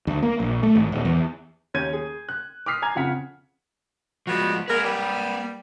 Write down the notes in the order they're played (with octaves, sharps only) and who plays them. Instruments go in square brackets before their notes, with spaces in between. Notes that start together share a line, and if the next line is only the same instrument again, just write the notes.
[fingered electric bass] D2
A#3
A#1
A3
G#1
D#1
E2
[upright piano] D#2 C#4 C#5 G6 G#6 D#7
G#4
F#6
D6 D#6 F6 B6 C7
G#5 A#5 G#6 F7
F2 C#3 F#5 B6
[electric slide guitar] F3 G#3 [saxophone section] G3 B3 F#4
[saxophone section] G#3 A#4 [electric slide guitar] A#3 B4
[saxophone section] G3